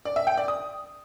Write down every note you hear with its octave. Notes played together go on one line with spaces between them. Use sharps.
D5
E5
G5
D5
D#6